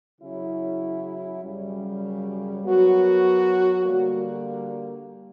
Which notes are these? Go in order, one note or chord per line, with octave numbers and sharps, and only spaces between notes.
C#3 F#3 C#4 E4
F#2 C#3 G3
F#3 B3 F#4 A#4
D3 G3 A#3